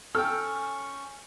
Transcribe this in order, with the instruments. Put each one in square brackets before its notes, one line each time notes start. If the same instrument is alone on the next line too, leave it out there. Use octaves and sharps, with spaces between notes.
[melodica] C#4 C#6 [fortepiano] A4 G5 [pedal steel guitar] E6 [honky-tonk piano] F6